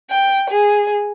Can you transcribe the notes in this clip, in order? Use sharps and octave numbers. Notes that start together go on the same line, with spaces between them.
G5
G#4